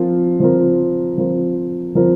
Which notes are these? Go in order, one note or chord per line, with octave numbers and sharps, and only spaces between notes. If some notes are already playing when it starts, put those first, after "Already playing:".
Already playing: F3 C4 F4 A#4
F3 C4 F4 A#4
F3 C4 F4 A#4
F3 C4 F4 A#4